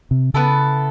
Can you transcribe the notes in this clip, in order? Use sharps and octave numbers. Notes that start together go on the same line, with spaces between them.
C3
C#3 B3 E4 A4